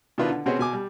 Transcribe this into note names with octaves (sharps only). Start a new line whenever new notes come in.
B2 D#3 D4 E4 F4 B4
D3
B2 B3 C4 F#4 G#4 C#5
B2 G#5 D6
G3